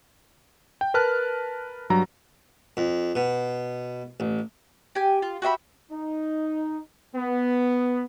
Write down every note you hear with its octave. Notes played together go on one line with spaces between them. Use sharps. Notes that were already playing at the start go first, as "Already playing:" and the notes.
G5
A#4 B4 A5 F6 F#6
G2 F#3 A#5
F2
B2
A1
G4 G#5
F4
F#4 G4 E5 B5
D#4
B3